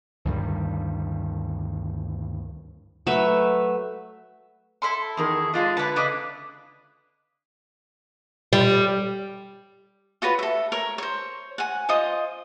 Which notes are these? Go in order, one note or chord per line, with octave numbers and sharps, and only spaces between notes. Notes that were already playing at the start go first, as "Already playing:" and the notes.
D2 G2 D#3 G3
F#3 A3 B4 E5
E4 A4 C6
E2 D#3 G#4 A#4
G#3 D4 F4 D#5
D3 E4 B4 A5
C#3 D4 E4 D#5
G3
F4 F#4 B4 C#5
A4 E5
A#4 C#5
C5 C#5
F#5 G#5
F4 C5 D#5 D#6